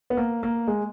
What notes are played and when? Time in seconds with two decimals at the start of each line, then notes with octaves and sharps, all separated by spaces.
0.10 B3
0.17 A#3
0.43 A#3
0.67 G#3